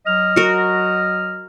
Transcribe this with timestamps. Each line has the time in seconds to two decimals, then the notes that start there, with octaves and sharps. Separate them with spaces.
0.06 F#3 D#5 F6
0.36 F#4 A#4